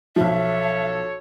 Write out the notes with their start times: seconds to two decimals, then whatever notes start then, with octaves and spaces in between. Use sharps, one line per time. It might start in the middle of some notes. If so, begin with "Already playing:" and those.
0.16 B1 F3 A4 C#5 E5